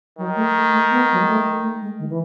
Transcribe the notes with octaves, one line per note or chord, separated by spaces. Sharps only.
D#3 F#3
A3
A3
A3
B3
F#3
G#3
A3
A3
G#3
D#3
E3